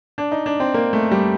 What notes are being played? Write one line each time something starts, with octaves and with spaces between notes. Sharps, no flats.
D4
D#4
D4
C4
A#3
A3
G3